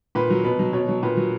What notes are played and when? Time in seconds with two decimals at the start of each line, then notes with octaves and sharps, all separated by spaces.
0.15 A#2 B4
0.30 F#3
0.44 B2 B4
0.59 F#3
0.73 B2 C#5
0.88 F#3
1.03 A#2 B4
1.17 F#3